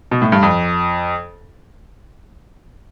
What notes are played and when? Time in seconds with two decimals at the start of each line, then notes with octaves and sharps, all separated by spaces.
0.11 B2
0.22 A2
0.32 G2
0.43 F2